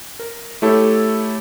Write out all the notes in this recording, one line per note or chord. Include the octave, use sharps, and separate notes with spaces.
A#4
A3 E4 G4 A4 C#5